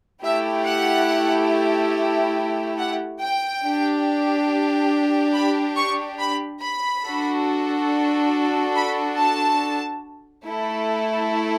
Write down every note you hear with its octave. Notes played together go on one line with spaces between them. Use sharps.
A3 E4 G4 E5
F#5
F#5
G5
D4 G4
B5
C#6
B5
B5
D4 F#4 A4
B5
A5
A3 E4 A4